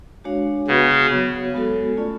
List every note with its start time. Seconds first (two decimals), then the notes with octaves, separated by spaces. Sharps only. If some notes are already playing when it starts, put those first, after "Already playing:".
0.24 G#3 D4 F#4 C#5 F5
0.68 C#3 B3 F#4 B4 F#5
1.11 F#3 B3 F#4 C#5
1.54 G#3 B3 F#4 A4
1.97 A3 C#4 F4 A4 D5